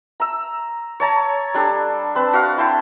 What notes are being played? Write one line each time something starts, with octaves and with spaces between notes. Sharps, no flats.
A#5 E6
C#5 A5 A#5
G3 D4 A4
C4 B4 A5
F#4 F5
E4 G5 A5 C6